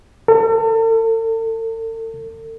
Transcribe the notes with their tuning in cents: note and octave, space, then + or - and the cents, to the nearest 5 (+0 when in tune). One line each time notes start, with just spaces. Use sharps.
A4 +40